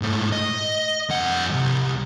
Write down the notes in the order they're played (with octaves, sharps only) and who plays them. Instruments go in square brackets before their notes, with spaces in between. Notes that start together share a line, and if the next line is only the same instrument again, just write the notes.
[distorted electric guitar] G#2 A3
D#5
F2 F#5
C2